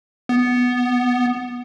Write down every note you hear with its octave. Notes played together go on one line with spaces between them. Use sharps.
B3